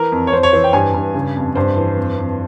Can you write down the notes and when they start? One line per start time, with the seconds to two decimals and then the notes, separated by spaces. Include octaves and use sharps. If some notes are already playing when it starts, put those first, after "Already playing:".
Already playing: E3 A#4
0.12 F2
0.27 C#5
0.33 F2 C5
0.43 C#5
0.53 E3 C5
0.64 G5
0.73 G2 G#5
0.94 G2
1.14 C#3
1.36 F2
1.55 G2 C5
1.77 E3
1.97 F2
2.18 F2